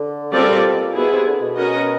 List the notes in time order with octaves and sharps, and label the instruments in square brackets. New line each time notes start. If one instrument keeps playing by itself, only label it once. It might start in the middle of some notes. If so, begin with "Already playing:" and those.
Already playing: [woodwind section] D3
[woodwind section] C#3 [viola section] G3 C4 F4 A4 D5
[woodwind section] A#2
B2
A#2
[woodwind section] B2 [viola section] B3 E4 G#4
[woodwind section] C3
D3
B2
[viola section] C#4 F#4 A#4 D#5